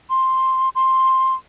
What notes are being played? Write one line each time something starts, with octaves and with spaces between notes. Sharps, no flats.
C6
C6